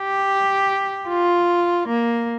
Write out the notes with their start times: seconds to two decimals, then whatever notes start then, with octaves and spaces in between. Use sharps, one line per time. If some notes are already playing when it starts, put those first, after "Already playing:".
Already playing: G4
1.09 F4
1.88 A#3